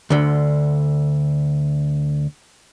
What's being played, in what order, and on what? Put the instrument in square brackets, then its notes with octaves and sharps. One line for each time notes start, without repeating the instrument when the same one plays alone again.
[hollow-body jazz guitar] D2 D3